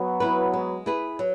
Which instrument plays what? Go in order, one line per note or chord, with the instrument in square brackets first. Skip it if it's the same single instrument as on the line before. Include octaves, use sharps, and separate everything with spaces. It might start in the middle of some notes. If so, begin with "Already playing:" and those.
Already playing: [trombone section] F#3 B3
[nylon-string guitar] E4 B4
G#3
E4 G#4 B4
F#3